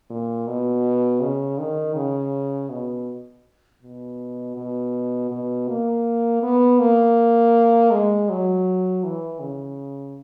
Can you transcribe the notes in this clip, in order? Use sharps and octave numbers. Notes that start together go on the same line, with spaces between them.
A#2
B2
C#3
D#3
C#3
B2
B2
B2
B2
A#3
B3
A#3
G#3
F#3
E3
C#3